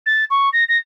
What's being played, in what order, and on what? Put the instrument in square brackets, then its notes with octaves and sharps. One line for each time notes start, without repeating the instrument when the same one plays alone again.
[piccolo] A6
C#6
A#6
A#6